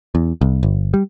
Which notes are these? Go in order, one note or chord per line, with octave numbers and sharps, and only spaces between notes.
E2
C2
G1
G3